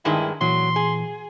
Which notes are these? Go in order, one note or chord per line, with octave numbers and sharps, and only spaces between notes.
G2 D#3 G#3 E4
A#2 E3 F#3 C6
G#4